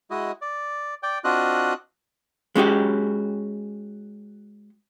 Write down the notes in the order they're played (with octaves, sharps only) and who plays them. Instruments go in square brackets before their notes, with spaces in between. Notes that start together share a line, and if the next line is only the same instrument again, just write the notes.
[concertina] G#3 E4 F#4 D#5
D5
D5 G5
C4 D4 F4 F#4 D#5 F#6
[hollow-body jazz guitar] G#3 C#4 F#4 G4